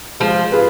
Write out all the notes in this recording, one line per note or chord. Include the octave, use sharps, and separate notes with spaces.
F3 G#3
F4 G#4 B4